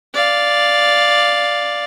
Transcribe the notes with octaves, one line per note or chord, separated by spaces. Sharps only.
D5 F5